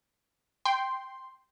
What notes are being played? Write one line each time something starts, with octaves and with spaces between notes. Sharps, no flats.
G5 C6